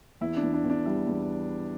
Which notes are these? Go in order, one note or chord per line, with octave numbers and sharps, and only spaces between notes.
E2 E4
D4
E2
D4
E2
D4
G3 E4
E2